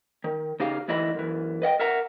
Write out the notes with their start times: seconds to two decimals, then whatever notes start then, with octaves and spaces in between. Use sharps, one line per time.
0.24 D#3
0.60 C#3 D#4 G4 F5
0.88 D2 E3 E4 D#5 B5
1.14 F#2 E3
1.62 B4 D#5 F#5 G5
1.80 A#4 E5 F#5 A#5